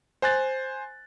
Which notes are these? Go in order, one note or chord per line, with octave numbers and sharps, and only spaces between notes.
C5 G#5 F#6 A6